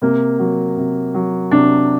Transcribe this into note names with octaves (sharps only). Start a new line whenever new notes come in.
C3 A#3
F#3
C3
F#3
C3 D4